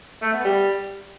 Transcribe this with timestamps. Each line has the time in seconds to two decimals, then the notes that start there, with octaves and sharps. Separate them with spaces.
0.22 A3
0.33 B3
0.44 G3